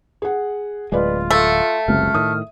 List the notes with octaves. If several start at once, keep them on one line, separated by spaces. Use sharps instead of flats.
G#4 F#5
D1 G#3 F4 B4 D5 D#5
A3 A4 F5 E6
F#1 C#2 C3 F6
A2 D#3 D#6